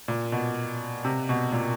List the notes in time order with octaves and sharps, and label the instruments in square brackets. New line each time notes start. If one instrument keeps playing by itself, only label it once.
[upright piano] A#2
B2
C3
B2
A#2